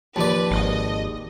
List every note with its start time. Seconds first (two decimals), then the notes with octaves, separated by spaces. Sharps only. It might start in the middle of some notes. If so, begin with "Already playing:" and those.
0.16 D#2 F3 G4 B4 D5 A5
0.51 G#1 D#5